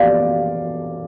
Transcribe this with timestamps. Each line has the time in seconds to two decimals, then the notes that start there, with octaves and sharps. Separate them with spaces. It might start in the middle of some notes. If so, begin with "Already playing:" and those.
Already playing: D5 F5